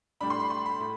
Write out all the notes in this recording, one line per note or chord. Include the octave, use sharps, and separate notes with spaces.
A2 G3 D4 B5
C6
B5
C6
B5
A2